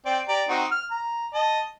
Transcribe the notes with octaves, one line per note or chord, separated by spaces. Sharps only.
C4 D5 G5
G4 D5 A#5
C4 D#4 F#4
F6
A#5
D#5 A5